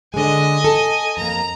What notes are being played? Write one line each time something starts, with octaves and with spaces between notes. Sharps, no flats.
D3 G#3 D#5 G#5
A4
F2 A#3 A#5